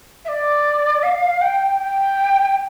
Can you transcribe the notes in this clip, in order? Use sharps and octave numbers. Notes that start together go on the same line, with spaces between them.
E5
D5
F5
G5
G5